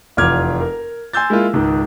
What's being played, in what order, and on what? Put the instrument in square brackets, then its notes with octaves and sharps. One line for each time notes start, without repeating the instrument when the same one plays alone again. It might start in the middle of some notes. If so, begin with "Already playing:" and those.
[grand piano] F1 E2 F4 D6 F6 G#6
A#4
G#5 C6 E6 G6 A6
G#3 A#3 E4 F4
C#2 G#2 D#3